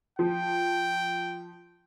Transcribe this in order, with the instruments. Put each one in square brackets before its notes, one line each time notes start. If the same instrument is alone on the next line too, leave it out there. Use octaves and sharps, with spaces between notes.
[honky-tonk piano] F3 [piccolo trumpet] G5